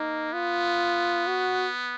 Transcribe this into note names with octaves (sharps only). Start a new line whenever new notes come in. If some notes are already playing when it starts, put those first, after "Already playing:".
Already playing: A#3 D#4
B3 F4
F#4